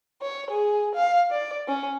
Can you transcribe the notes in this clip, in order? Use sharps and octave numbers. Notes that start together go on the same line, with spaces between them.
C#5
G#4
F5
D5
C#4